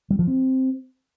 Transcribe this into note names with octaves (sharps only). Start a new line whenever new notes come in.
G3
F3
C4